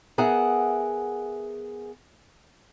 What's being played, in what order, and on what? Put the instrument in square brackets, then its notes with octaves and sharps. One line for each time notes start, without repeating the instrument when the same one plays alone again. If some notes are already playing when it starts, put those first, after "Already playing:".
[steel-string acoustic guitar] B3 G#4 A#4 E5 F#5